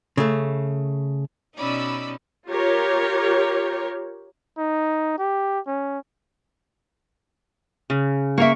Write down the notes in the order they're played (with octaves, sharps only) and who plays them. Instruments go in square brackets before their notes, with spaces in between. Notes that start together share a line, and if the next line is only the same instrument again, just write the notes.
[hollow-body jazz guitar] C#3 A3
[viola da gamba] B2 C#4 D#4 [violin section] D5 B5 E6
[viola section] F4 G4 A#4 C#5
[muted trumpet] D#4
G4
C#4
[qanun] C#3
[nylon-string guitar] A#3 E5 [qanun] A#4 C#6